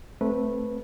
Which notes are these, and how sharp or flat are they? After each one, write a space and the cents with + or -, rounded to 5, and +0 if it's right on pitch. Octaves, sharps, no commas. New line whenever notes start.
A3 +0 C4 +5 B4 -15